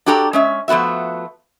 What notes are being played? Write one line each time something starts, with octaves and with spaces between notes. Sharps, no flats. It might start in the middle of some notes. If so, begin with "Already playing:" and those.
D4 F#4 G4 A4 A#5
G#3 C#4 E5
F3 A3 B3 F#4 E5